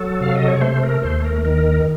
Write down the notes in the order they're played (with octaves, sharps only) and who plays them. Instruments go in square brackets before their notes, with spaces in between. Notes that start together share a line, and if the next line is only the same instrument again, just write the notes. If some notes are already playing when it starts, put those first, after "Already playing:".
Already playing: [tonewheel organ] F#3 A4
C3 F5
D#5
C#5
A3 C5
A#4
D#2 C5
A#4
D#3 A#4